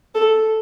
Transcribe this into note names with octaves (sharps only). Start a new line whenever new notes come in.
A4